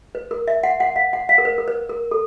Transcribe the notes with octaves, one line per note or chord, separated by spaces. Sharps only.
B4
A#4
E5
F#5
F#5
F5
F#5
F5
A#4
B4
A#4
B4
A#4
A4